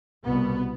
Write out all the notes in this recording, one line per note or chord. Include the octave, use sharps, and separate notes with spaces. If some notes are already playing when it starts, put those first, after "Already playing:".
C2 B2 B3